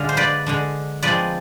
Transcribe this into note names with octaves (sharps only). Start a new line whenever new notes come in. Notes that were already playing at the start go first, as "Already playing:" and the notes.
Already playing: D3 G#3 D4 F5
C5
B4 D5
D3 G#3 D4
F3 G#3 C4 B4 D5